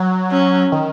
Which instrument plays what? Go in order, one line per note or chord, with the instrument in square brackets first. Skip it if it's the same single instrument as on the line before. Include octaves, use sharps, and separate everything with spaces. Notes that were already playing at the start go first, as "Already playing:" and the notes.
Already playing: [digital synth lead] F#3
[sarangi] C#4
[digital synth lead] D#3